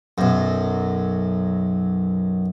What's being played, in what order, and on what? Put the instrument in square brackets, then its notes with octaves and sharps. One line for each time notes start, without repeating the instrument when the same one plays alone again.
[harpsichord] B1 F#2